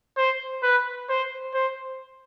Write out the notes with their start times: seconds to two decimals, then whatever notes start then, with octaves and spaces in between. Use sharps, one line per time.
0.17 C5
0.63 B4
1.09 C5
1.54 C5